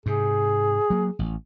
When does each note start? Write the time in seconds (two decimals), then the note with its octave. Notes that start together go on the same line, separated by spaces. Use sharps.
0.06 G#2 C3 G#4
0.90 F#3 A#3
1.19 A1